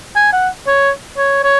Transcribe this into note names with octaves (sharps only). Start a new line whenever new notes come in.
G#5
F#5
C#5
C#5
C#5